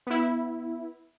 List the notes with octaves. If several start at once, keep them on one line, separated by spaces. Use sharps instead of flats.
B3 E4